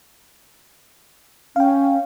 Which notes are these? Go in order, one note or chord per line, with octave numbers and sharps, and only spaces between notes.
C#4 F5 G5